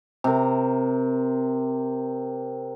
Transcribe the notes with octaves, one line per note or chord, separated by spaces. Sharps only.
C3 A#4